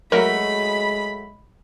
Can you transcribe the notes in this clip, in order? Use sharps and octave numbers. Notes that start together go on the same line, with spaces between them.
F#3 G#3 A3 F#4 A#4 B5